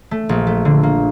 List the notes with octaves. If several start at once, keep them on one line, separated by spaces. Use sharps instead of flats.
A3
A#1
A3
D3
A#3